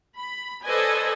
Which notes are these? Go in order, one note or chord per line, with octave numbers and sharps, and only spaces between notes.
B5
A4 B4 C5 D5 D#5 G#5